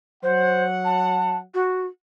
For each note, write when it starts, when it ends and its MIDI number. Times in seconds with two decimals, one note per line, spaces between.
0.23 1.43 54
0.23 0.65 72
0.23 1.43 78
0.85 1.36 81
1.54 1.85 66